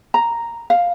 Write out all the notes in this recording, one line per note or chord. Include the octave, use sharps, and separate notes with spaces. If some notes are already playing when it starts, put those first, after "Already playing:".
A#5
F5